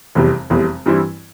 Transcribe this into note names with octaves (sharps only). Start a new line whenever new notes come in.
F1 E2 C3 G3
F1 E2 C3 G3
G2 E3 G3 C4 E4